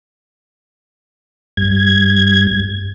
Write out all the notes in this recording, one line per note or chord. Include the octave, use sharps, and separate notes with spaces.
G2 G#6